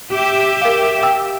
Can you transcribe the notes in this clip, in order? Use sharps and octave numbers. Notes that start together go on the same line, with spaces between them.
G4 E5
A#4 F5
G5 E6